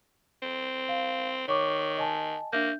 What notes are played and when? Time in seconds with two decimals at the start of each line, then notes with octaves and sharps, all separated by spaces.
0.42 C4
0.89 F5
1.48 D#3 C#5 C#6 D6
1.98 D#5 G#5 A5
2.53 A#3 D4 E5 G6